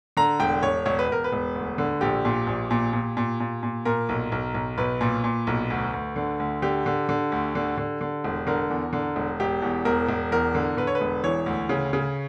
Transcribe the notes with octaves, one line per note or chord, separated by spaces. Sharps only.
D3 A#5
E1 G5
E1 C#5
E1 C#5
B4
E1 A#4
B4
E1
D2
D3
A#1 G4
A#2
A#1
A#2
A#2
A#2
A#2
A#2
A#2 A#4
B1
B1
B1
B1 B4
A#2
A#2
B1
D2
D2
D3
D2
D3 G4
D3
D3
D2
D3
D3
D3
E1
D3 A#4
E2
D3
E1
E1 G4
E2
E1 A#4
E1
E2 A#4
D3
D3 B4
C#5
B4
E1
E3 C#5
D2
C#3
C#3